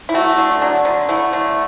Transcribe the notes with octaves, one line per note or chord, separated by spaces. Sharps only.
E4
A3 F#4
D3
F#3 D4
D3
A3 E4
D3